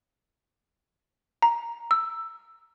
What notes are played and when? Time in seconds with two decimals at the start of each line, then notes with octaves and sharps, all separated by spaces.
1.42 A#5
1.91 E6